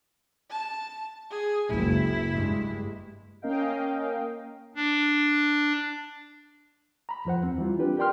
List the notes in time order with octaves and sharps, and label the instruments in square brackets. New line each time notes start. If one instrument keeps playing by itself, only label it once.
[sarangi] A5
G#4
[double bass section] F#1 C#2 [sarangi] E4
[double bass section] G2 G#3
[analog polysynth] A#3 C#4 A#4 D#5 F5 G5
[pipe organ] D4
[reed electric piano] A#5 B5
F2 F3 C5 F#5
D#2 C4
E3 G3 F4
C4 D4 F4 G4 B4
G4 A#4 D5 G5 C6 F6